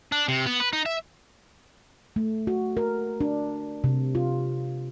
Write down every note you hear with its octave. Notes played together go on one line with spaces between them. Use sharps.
D4
C3
B3
B4
D#4
E5
A3
F#4
A#4
D4
C3
F4